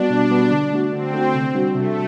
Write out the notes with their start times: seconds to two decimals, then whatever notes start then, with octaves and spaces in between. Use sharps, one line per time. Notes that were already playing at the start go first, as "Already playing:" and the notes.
Already playing: G3 B3 D4 F#4
0.10 B2
0.31 G3 B3 F#4
0.51 D3
0.72 A3 D4 F#4
0.93 D3 C4
1.13 A3 D4 F#4
1.34 C3
1.55 G3 D4 F#4
1.75 C3 A3